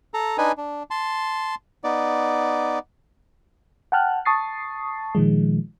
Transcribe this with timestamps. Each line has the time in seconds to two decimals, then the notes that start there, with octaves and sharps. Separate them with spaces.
0.14 A4 A#5
0.38 D4 D#4 B4 G#5
0.58 D4
0.91 A5 C6
1.84 B3 D#4 D5
3.92 F#5 G5 A5 F6 F#6
4.25 A5 C#6 D#6 A6 C7
5.15 A#2 D#3 F3 G#3